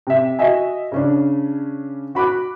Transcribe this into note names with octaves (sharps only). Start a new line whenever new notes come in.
C3 E5
F#4 D#5 E5 G#5
C#3 C#4 D4
F#4 B5 D6 F#6